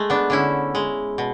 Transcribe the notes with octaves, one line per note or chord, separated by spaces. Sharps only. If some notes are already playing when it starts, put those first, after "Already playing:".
Already playing: G#3 A3
B3 D4
D3 C#4 E4
G#3
B2